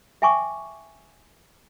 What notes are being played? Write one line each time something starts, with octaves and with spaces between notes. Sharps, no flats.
E5 G5 G#5 B5 C#6 D6